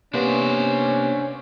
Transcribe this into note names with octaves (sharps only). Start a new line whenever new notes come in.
C3 A#3 B3 C#4 D4 C5